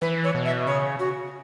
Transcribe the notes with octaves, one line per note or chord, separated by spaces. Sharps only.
E3 B4
C#5
B2
E5
C#3 C#5
F#4